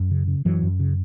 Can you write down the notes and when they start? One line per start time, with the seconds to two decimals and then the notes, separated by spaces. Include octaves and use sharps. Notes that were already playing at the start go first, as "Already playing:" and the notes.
Already playing: F#2
0.11 C#3
0.27 C#3
0.45 F#2 E3 F#3
0.63 F#2
0.80 C#3